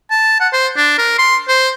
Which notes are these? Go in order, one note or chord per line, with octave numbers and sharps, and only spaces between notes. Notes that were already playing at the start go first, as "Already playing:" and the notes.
A5
F#5
C5
D4
A#4
C6
C5